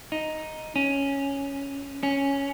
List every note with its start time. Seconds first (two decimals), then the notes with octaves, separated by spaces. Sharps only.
0.12 D#4
0.76 C#4
2.03 C#4